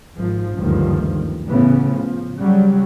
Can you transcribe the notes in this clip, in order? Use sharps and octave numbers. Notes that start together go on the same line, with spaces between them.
G#1 F3
F#1 D2 G2 D#3 F3
A2 C#3 E3 B3
F3
C#3 F#3 G3